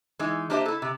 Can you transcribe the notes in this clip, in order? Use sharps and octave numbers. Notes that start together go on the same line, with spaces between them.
E3 G#3 D#4
A#3 D4 G4 C5 D#5 E5
E4 A4
C3